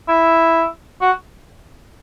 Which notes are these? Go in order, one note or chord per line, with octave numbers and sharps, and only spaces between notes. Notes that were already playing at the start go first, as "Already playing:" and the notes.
E4
F#4